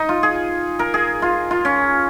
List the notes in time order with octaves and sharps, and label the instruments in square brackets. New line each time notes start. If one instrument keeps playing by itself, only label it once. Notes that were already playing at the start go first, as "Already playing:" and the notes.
Already playing: [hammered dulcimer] D#4
F4
G#4
A#4
G#4
F4
F4
C#4